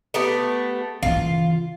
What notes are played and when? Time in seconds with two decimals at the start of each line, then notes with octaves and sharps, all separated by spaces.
0.14 A3 B3 G4
1.03 C#3 E3 F4